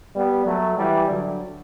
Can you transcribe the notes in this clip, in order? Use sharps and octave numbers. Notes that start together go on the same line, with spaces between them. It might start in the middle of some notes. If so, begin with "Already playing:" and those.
G3 B3
F#3 A3
E3 G3
D3 F#3